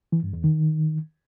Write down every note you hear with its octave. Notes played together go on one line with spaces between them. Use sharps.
E3
G2
E2
D#3